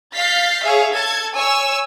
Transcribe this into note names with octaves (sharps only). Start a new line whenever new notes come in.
F5 F6 G6 A6 B6 C7
G#4 C#5 E5 F5
A4 A5 G#6
C#5 G#5 E6